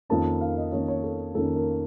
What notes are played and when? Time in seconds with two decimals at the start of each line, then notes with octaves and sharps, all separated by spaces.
0.09 F2 D#3 A#3 C#4 A5
0.41 F5
0.57 D#5
0.72 F2 D#3 A#3 C#4 C#5
0.88 C#5
1.04 A4
1.35 F2 D#3 A#3 C#4 A4
1.56 A#4